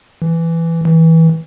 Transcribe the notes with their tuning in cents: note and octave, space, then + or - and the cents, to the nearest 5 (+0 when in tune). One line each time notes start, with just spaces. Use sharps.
E3 +10
E3 -20